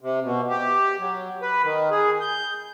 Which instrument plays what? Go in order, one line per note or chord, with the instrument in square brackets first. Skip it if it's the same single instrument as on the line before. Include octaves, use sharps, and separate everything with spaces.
[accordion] C3
B2
G4
F#3
B4
D#3
G#4
G6